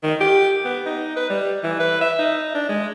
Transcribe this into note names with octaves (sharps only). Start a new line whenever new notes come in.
D#3
G4
B3
D#4
B4
G3
E3
B4
E5
D#4
D4
G#3